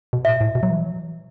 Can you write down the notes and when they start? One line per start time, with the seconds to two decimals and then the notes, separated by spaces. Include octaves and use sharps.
0.13 B2
0.25 A2 E5
0.41 A2
0.55 B2
0.63 F#3
0.70 E3